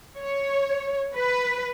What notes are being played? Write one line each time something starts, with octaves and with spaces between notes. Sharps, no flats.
C#5
B4